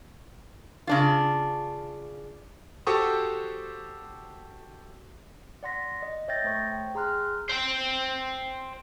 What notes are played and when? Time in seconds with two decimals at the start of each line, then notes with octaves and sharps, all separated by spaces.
0.87 C#3 D4 F4
2.87 F#4 G4 A4 C5 C#6 D#6
5.63 D5 F#5 C6 A#6 B6
6.03 D#5
6.28 C#5 E5 G5 G6 A6 A#6
6.44 A3 C5 C#6 G#6
6.71 G5
6.95 G#4 A#5 C6 F6 F#6
7.50 C5 G5